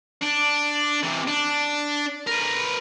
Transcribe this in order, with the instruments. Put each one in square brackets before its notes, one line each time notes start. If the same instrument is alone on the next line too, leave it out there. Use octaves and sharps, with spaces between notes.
[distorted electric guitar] D4
C3 E3
D4
A#4 B4